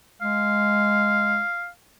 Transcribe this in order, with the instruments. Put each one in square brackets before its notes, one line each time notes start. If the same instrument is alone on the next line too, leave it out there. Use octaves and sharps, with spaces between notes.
[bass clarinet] G#3 [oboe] F5